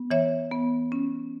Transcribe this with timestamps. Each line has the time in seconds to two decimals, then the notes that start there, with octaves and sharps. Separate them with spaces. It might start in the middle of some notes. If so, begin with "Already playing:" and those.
Already playing: B3
0.11 E3 C#5 E5
0.52 B3
0.92 C#4